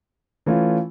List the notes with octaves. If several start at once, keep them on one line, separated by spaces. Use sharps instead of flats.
E3 A3 C#4 F4